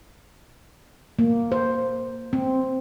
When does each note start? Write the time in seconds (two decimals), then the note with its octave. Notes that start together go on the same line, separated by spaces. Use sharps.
1.19 A#3
1.52 C5
2.33 C4